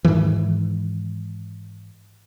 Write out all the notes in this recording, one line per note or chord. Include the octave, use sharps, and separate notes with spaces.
G#2 C3 D#3 E3